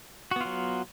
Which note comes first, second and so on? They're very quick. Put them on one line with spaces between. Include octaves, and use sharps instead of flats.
F#4 B3 F4 F#3